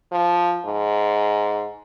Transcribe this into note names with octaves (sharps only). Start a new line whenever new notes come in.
F3
G#2